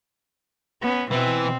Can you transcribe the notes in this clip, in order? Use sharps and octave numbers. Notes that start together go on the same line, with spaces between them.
B3 C#4
B2 E3 C4